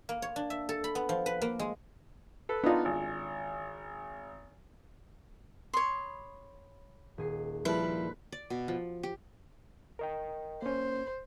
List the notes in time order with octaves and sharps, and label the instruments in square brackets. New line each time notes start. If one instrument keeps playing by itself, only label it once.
[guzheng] A#3
C#5
D4
E5
A4
B5
B3
F3
B4
A#3
G#3
[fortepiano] A4 B4
[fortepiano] B3 D#4 [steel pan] D4 F4
[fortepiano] G#1
[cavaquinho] C#5 C6 [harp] B5 D#6
[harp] D#1 G#4 C7
[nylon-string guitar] F3 G3 E4 [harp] A#3 A5 [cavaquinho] B4
[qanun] D5
B2
F3
G4
[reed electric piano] A#4 D#5 G5
[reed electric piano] A#3 C#4 [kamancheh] C5